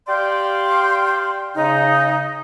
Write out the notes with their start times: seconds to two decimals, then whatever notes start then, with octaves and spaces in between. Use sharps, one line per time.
0.08 G4 D5 F5 G5 C6
1.56 C#3 D#4